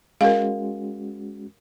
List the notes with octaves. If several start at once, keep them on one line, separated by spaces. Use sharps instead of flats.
G#3 C#4 F#4 A#4 F5